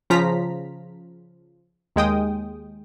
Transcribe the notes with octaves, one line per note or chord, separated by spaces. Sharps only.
C#3 F3 F4 A#5 B6
D#2 G#3 G5 D#6